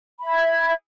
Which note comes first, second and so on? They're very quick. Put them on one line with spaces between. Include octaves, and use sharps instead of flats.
B5 E5 G#6